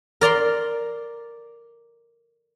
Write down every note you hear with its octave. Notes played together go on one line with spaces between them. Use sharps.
A#4 D5 A#5 C6